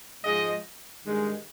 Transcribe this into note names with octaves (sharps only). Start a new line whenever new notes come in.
G#2 F3 G#3 D#5
G2 D#3 G#3